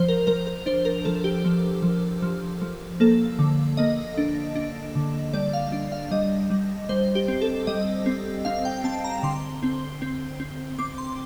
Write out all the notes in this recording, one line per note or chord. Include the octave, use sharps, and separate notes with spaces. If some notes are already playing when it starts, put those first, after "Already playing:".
Already playing: F3 C5
A#4
F3 A#4
A#4
D4 C5
A#4
F3 A4
G4
F3
F3
F3
F3
A#3 A4
D3
A#3 D#5
D4
D4
D3
G3 D5
F5
D4
F5
G3 D#5
G3
G3 C5
G4
C4
A4
G3 D#5
C4
C4 F5
G5
C4 A5
A#5
D3 C6
C4
C4
C4
C4 D6
C6